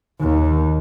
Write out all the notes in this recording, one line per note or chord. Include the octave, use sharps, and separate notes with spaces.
D#2